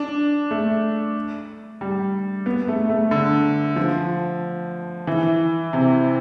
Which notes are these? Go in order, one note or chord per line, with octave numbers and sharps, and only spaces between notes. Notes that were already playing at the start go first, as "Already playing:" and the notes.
Already playing: D4
A3
G3
B3
A3
A3
D3
F3
E3
C3